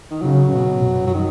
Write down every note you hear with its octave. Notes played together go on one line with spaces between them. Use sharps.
D#3
C#3 F#3
B2
F#2
F#3
D#3